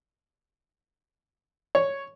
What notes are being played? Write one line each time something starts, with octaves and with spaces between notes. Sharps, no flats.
C#5